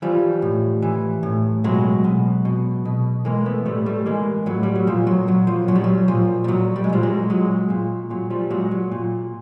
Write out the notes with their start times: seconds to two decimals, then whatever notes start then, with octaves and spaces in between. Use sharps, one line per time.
0.02 E3 F3 G3
0.42 A2
0.82 E3
1.23 A2
1.64 B2 F#3 G#3
2.04 B2
2.45 B2
2.85 B2
3.25 E3 G#3 A#3
3.45 A3 B3
3.65 A2 G3 A3
3.86 G3 A3
4.06 E3 G#3 A#3
4.46 A2 F#3
4.63 G3
4.76 F#3
4.87 A#2 F3
5.07 F#3
5.28 A#2 F#3
5.47 F3
5.68 A#2 F#3
5.75 G3
5.84 F#3
6.08 A#2 F3
6.44 G3
6.48 A#2 F#3
6.76 G3
6.84 G#3
6.90 A#2 F3 G3
7.03 F#3 G#3
7.30 A#2 F#3 G#3
7.70 A#2
8.10 A#2 F#3
8.30 F3 G3
8.50 A#2 F#3 G#3
8.71 F#3
8.92 A#2